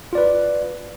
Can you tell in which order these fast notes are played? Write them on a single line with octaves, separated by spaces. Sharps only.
F4 D5 B4